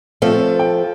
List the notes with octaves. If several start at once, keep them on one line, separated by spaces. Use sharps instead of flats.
F3 A3 C4 A4
G5